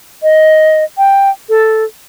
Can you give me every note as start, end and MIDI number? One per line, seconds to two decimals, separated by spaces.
0.23 0.84 75
0.98 1.30 79
1.49 1.84 69